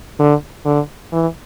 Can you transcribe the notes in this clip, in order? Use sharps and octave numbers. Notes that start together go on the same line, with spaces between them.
D3
D3
E3